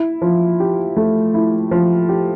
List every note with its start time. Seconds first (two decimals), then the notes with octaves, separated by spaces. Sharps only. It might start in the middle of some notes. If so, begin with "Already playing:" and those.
Already playing: E4
0.22 F3
0.60 G4
0.97 A3
1.34 E4
1.71 F3
2.09 G4